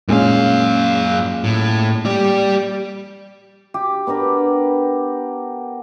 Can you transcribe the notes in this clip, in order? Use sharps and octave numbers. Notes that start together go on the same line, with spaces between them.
F#2 A#2 G#3 C#4 F5
A2
G4 D5
G4
B3 D4 G4 A#4